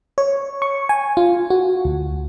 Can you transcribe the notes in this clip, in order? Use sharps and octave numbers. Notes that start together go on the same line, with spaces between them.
C#5
C#6
G#5
F4
F#4
D2